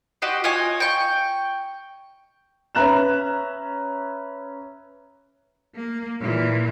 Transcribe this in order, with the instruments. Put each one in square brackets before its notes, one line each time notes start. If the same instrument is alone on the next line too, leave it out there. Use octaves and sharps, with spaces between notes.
[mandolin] F#4 G4 D#5 C6
F4 C#5 D#5 G#5
G5 C#6
[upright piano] C#4 B4 E5 A#5 F#6 E7
[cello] A#3
A#2 E3